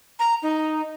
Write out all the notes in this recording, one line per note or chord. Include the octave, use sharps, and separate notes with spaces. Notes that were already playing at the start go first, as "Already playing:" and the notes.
A#5
D#4